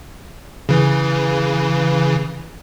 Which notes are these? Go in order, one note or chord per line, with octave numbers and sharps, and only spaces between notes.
C#3 E3